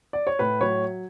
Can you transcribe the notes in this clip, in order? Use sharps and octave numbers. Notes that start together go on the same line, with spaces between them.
D5
C#5
A2 B4
F#3 C#5